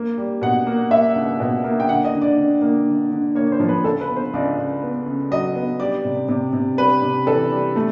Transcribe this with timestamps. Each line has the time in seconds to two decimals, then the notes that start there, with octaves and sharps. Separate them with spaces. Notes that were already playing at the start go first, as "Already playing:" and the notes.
Already playing: A#3
0.18 G3
0.42 B2 F#5
0.67 A#3
0.91 A#3 E5
1.16 C#2
1.40 B2
1.64 A#3
1.80 G5
1.89 D3 F#5
2.05 D#5
2.13 D3
2.22 D5
2.37 D3
2.62 A#3
2.86 D3
3.11 D3
3.35 A#3 C#5
3.52 C5
3.60 F3
3.69 B4
3.84 C#2 A4
4.01 B4
4.08 B3
4.16 C5
4.34 C#2 D5
4.58 C#2
4.83 B3
5.06 C#3
5.31 F#3 D#5
5.55 B3
5.80 G3 D5
6.05 C3
6.29 C3
6.53 C3
6.77 G3 B4
7.02 C3
7.27 E3 A4
7.52 G3
7.76 A3